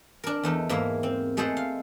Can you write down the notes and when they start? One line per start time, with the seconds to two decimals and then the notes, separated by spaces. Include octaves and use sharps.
0.24 D4 A#4
0.43 E2 A3 D#4
0.69 G#2 A#3 E4
1.03 C4
1.37 G#3 A3 G#4 A4 C5 F#5
1.57 F5